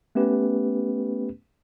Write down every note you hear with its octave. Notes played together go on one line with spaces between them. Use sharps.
A3 B3 C#4 G4 B4